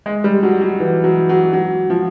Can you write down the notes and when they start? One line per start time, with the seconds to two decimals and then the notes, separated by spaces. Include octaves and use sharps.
0.06 G#3
0.24 G3
0.43 F#3
0.61 F#3
0.80 E3
1.04 F#3
1.29 F#3
1.53 F#3
1.90 F3